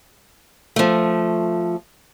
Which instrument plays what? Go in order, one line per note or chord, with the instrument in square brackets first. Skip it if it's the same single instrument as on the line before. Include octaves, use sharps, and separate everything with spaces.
[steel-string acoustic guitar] F3 A3